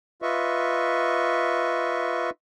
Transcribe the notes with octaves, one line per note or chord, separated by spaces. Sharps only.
F4 B4 D#5 E5 C#6